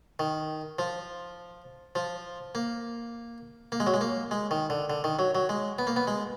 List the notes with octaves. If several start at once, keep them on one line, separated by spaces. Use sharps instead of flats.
D#3
F3
F3
A#3
A#3
G#3
F#3
G#3
A#3
G#3
D#3
D3
D3
D#3
F#3
F#3
G#3
B3
A#3
B3
G#3